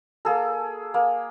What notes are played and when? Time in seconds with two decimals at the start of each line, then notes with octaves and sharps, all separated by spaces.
0.25 A#3 G#4 A4
0.94 A#3